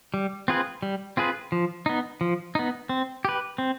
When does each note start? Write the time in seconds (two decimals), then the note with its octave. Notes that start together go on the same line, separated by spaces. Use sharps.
0.14 G3
0.48 C4 F4 G#4 B4
0.83 G3
1.17 C4 F4 G#4 B4
1.52 F3
1.86 B3 D#4
2.21 F3
2.55 B3 D#4
2.89 C4
3.25 G4 B4
3.58 C4